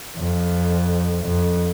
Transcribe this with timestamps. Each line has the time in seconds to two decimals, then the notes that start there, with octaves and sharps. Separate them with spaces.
0.18 F2
1.26 F2